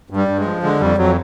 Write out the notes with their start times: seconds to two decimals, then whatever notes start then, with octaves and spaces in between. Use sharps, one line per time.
0.10 G2
0.16 G3
0.28 G2
0.39 G#3
0.45 F3
0.62 D3 G#3
0.80 F2 G3
0.98 F2 F#3